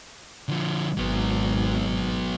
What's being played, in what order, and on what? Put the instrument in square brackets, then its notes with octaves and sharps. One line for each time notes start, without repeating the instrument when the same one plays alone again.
[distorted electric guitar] D3 F3
[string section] G#1 [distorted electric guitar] F#3 B3